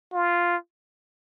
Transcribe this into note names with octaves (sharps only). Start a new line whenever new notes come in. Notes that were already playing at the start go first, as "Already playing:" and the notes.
F4